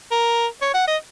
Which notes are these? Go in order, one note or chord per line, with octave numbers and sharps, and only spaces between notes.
A#4
C#5
F#5
D#5